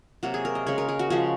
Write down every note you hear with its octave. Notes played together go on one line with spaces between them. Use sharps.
C3 F#3 A#3 F#4
G#4
A#4
D#5
C#3 G#3 C#5
A#4
G#4
F#4
C#3 F3 G#3 F#4